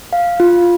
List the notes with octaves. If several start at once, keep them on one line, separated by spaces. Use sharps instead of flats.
F5
F4